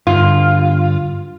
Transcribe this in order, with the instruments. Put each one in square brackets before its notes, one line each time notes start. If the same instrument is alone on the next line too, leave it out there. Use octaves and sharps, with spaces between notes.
[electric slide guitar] G2 D3 [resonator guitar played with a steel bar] F4